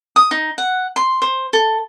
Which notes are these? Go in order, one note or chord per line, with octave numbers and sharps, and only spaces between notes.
D#6
D#4
F#5
C6
C5
A4